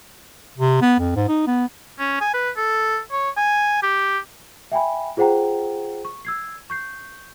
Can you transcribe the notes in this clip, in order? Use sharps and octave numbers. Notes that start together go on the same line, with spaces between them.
C3
B3
F2
G#2
D#4
B3
C#4
G#5
B4
A4
C#5
G#5
G4
E5 G5 G#5 B5
F4 G#4 C5 F#5 G5 A#5
C#6
E6 G#6 C7
C#6 G6 C7